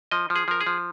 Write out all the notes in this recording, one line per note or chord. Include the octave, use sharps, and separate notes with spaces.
F3 D#5
F3
G#4
F3 A#4
G#4
F3